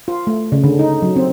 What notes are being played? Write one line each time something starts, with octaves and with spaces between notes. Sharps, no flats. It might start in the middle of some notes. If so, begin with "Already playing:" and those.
F4
A3
C#3
D3
D#4
F#3
C4